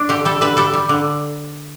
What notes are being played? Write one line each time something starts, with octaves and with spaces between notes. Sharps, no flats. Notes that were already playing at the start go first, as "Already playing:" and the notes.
Already playing: D4
D3 G4
G3 A4
D3 B4
G3 A4
G3
D3